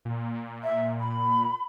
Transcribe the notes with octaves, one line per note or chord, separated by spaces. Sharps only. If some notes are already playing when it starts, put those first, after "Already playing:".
A#2
E5
B5